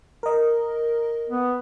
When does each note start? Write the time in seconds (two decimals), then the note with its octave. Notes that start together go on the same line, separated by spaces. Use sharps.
0.23 A#4 D#5
1.30 B3